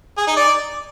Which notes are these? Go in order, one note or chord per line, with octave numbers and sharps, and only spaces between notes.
G#4
D#4
D5